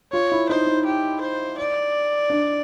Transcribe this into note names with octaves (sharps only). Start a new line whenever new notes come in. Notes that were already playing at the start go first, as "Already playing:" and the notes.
F4 C#5
E4
D#4 C5
D#4
G4
C5
D5
D4